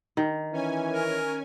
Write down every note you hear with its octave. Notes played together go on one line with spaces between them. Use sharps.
D#3
E3 C#4 G#5
A#4